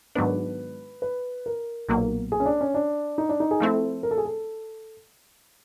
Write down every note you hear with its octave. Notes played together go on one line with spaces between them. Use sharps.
G#2 D#3 F#3 B3 D4 B4
B4
A#4
B1 A#2 F#3 A#3
G#4
C#4
D4
C#4
D4
D#4
D4
D#4
G#4
F3 A3 C4 E4 A4
A#4
A4
G#4
A4